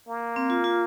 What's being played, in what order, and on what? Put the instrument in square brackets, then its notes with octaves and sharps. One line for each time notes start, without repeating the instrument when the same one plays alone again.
[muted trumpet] A#3
[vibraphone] C4
F4
F4